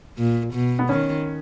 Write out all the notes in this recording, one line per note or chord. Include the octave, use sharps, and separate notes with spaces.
A#2
B2
B3
D#3 C#4